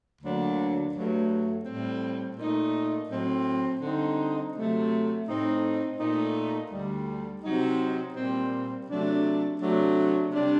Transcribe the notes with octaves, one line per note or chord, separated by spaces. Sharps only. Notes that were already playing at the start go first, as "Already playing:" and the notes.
D2 D3 F#3 A#3 D4
G2 F#3 A3
A2 G3 C4
A#2 A3 D#4
A2 F#3 C4
D3 G3 C4 D#4
C3 F#3 A3
A2 A3 C4 D#4
A#2 A3 D#4
D2 D3 G3
C3 F#3 C4 D#4
A#2 G3 C4
C3 F#3 A3 D4
C3 F#3 A3 D4
C3 G3 D4